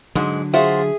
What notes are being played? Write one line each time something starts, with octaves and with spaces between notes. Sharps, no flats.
G#2 D3 F#3 G#3
F4 F#4 G#4 C5 E5